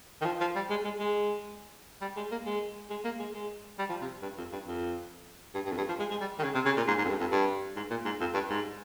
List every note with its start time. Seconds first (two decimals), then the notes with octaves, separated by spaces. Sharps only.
0.21 D#3
0.25 F3
0.41 F3
0.55 G3
0.70 G#3
0.85 G#3
0.99 G#3
2.01 G3
2.16 G#3
2.31 A#3
2.46 G#3
2.90 G#3
3.04 A#3
3.19 G#3
3.34 G#3
3.78 G3
3.89 F3
4.01 C3
4.22 G2
4.38 F2
4.52 G2
4.67 F2
5.54 G2
5.66 G2
5.72 F2
5.77 G2
5.89 F3
5.99 G#3
6.11 G#3
6.21 G3
6.39 D#3
6.43 C#3
6.55 C3
6.65 C#3
6.77 A#2
6.87 G#2
6.98 G#2
7.05 F2
7.10 G2
7.20 F2
7.32 G2
7.76 G#2
7.90 A#2
8.05 G#2
8.20 F2
8.34 G2
8.50 G#2